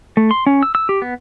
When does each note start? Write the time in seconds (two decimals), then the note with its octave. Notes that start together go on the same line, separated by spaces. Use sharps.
0.17 A3
0.31 C6
0.46 C#4
0.63 E6
0.75 E6
0.89 G4
1.02 B3